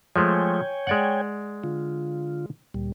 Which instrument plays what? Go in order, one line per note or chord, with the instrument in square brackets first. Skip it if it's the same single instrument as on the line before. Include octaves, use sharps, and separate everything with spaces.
[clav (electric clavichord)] F3 G#3 A3 [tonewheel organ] C#5 G5 G#5
[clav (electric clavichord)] G#3 D5 F#5
[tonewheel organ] D3 F4
D2 A#2 G3